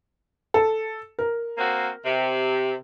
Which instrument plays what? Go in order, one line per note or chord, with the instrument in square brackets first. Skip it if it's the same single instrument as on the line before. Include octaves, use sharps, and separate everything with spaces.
[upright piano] A4
A#4
[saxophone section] A#3 C4 F#4
C3